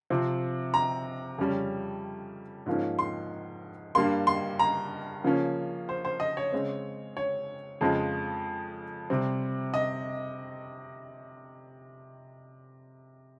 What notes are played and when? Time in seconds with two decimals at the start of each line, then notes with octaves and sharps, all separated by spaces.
0.10 C3 F3 C4
0.74 A#5
1.38 F2 C#3 G3 C#4
2.66 G#2 F3 A#3 C#4
2.99 C6
3.95 G2 G3 A#3 C6
4.27 C6
4.59 A#5
5.24 C#3 F3 A#3 C#4
5.89 C5
6.05 C5
6.20 D#5
6.37 C#5
6.52 C#3 G#3 C4
7.17 C#5
7.81 F2 C#3 F3 G#3
9.10 C3 G3 C4
9.74 D#5